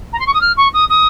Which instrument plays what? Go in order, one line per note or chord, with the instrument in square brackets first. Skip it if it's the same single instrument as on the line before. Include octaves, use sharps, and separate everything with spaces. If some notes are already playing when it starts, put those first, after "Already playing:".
[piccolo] A#5
C6
C#6
D#6
F6
C#6
D#6
D#6